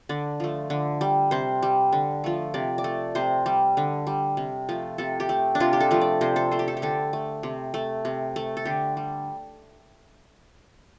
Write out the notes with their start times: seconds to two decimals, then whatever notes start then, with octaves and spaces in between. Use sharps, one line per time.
0.09 D3 D5
0.40 F3 A3
0.70 D3
1.01 G3
1.31 C3 C5
1.63 G3
1.92 D3
2.24 F3 A3
2.54 C3 D5
2.78 D5
2.84 A3
3.15 C3 C5
3.46 G3
3.77 D3
4.07 G3
4.37 C3
4.69 F3 A3
4.98 C3 A4
5.20 G4
5.29 A3
5.55 D4
5.60 C3 F4
5.73 G4
5.80 A4
5.91 F3 A3
6.01 D5
6.21 C3 C5
6.36 A4
6.51 A3 C5
6.59 G4
6.68 A4
6.77 G4
6.82 D3 A4
7.13 A3
7.43 C3
7.74 A3
8.05 C3
8.36 A3
8.57 A4
8.65 D3 G4
8.97 G3